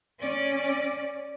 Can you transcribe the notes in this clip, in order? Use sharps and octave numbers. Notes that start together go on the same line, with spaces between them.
C#4 D5